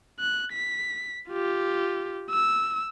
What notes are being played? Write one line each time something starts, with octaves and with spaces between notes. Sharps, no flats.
F#6
B6
F4 G4
E6